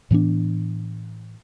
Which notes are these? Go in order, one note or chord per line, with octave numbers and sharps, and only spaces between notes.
A2 E3 B3 D4